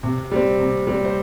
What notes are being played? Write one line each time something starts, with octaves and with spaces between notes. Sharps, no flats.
C3
G3 C4
C3
G3 C4
C5